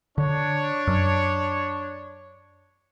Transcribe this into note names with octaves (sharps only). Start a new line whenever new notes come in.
D3 D4 C#5
F#2